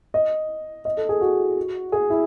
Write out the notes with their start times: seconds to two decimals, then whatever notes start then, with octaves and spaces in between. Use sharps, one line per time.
0.14 D#5
0.85 D#5
0.97 A4
1.09 G#4
1.21 F#4
1.92 G#4
2.10 E4